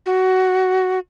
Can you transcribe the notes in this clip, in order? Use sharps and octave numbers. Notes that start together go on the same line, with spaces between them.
F#4